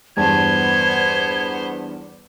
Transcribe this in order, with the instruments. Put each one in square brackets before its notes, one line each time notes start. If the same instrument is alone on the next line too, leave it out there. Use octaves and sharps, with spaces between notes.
[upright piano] E2 G2 A5 [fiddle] B3 C5 [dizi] G#6